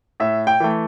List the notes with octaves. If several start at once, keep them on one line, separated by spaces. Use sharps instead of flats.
A2 E5
G5
E3 A3